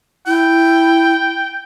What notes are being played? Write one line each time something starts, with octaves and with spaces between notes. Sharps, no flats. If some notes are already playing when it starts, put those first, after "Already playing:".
E4 G5